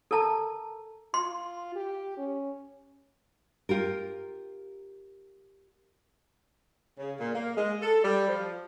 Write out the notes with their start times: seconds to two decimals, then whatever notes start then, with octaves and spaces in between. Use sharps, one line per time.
0.11 A4 A#4 A5 A#5
1.14 F4 C6
1.75 G4
2.17 C#4
3.69 F4 G4 A#4
6.98 C#3
7.20 A#2
7.35 A#3
7.57 G#3
7.82 A4
8.04 G3
8.29 F3